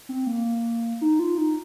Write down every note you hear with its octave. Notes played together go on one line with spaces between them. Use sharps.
C4
A#3
D#4
F4
D#4